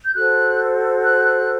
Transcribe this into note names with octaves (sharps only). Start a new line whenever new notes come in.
G6
F#4 A4 C5 F#6
F#6
F#6